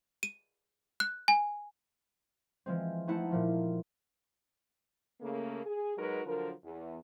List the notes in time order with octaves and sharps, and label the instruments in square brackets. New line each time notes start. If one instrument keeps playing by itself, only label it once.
[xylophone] D#7
F#6
G#5
[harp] E3 F3 G#3 C4
A3 C4 D#4 E4 F#5 A5
A#2 F3 A3
[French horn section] C#3 A3 A#3
G#4
F#3 G#3 D#4 F#4 A#4 B4
D3 F3 F#3 A#4
E2